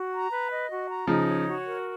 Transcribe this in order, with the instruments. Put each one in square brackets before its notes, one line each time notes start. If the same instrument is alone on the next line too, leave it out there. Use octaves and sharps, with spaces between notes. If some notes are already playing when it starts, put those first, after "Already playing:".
Already playing: [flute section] F#4
A#5
B4
D#5
F#4
A#5
[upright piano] C#3 F3 [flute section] D#4
[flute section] C#5
F#4
A#4